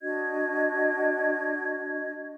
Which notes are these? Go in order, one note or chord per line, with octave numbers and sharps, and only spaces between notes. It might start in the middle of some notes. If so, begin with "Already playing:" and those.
D4 F#4 D#5 G#6